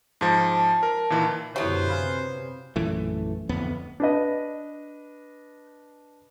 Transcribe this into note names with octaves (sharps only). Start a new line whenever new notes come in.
G#2 F3 A5
A#4
A#2 D#3 E3
F#2 B2 D3 F#3 B3 E4 G4 C5
C3 B4 F5 G#5
A#1 F#2 E3 A3
D1 F2 B3
D4 B4 D#5